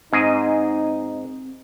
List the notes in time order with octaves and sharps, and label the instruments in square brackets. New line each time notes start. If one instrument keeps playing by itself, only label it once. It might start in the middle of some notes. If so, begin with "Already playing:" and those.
[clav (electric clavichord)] G#2 G#4 D#5 [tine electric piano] C4 [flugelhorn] D#4